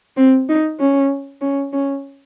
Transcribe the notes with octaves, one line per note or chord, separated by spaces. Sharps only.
C4
D#4
C#4
C#4
C#4